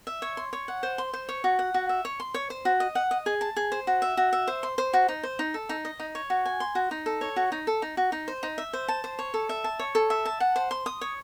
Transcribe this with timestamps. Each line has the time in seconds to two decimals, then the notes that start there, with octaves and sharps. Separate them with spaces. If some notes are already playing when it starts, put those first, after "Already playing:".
0.07 E5
0.22 C#5
0.37 C6
0.53 C#5
0.68 F#5
0.83 C5
0.98 C6
1.13 C5
1.29 C#5
1.44 F#4
1.59 F#5
1.74 F#4
1.89 E5
2.05 C#5
2.20 C6
2.34 C#5
2.50 C5
2.65 F#4
2.80 D#5
2.95 F#5
3.11 D#5
3.26 G#4
3.41 A5
3.56 G#4
3.72 C5
3.87 F#4
4.02 E5
4.17 F#4
4.33 E5
4.48 C5
4.63 C6
4.78 C5
4.93 F#4
5.08 D#4
5.23 C5
5.39 D#4
5.54 A4
5.69 D#4
5.85 D#5
5.99 D#4
6.15 C#5
6.30 F#4
6.46 G#5
6.60 C6
6.75 F#4
6.91 D#4
7.06 A4
7.21 C#5
7.36 F#4
7.52 D#4
7.67 A4
7.82 D#4
7.97 F#4
8.12 D#4
8.28 C5
8.43 D#4
8.58 E5
8.73 C5
8.88 A5
9.04 C5
9.19 C#5
9.34 A4
9.49 E5
9.64 A5
9.79 C#5
9.95 A4
10.10 E5
10.25 A5
10.40 F#5
10.56 C5
10.71 C6
10.86 D#6
11.01 C#5